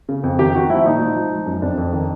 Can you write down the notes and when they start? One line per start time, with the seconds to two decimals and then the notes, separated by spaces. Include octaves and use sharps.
0.09 C#3
0.24 F2
0.39 D#3 G4
0.54 D#3 F#4
0.70 F3 E4
0.85 A#2 D#4
1.01 F3
1.16 F3
1.31 F3
1.46 F#2
1.62 F2 D4
1.78 F2
1.93 D#3